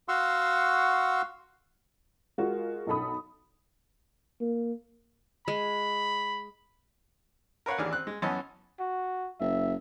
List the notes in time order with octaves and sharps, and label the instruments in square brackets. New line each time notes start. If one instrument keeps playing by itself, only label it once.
[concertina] F#4 F5 F#5 C6 C#6 E6
[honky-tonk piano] G#3 F4 F#4 A#4
B1 D#4 A4 B5 D#6
[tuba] A#3
[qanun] G#3 [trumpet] B5
[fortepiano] A#4 B4 C#5 F5 F#5
A1 D#2 E3 D4 G#4 F6
C4 F#6
G#3
F#2 E3 B3 C#4 D#5 A5
[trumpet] F#4
[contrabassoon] F#1 [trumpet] E5